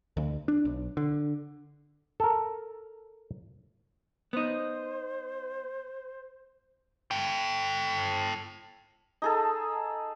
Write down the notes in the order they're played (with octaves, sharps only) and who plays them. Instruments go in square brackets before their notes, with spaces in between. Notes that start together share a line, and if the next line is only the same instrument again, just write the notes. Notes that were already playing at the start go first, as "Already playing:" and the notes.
[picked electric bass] D2
D4
B1
D3
[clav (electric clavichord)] A4 A#4
[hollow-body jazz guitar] B3 D#4 [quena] C5
[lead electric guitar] A4 G5
[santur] D#4 G#4 A4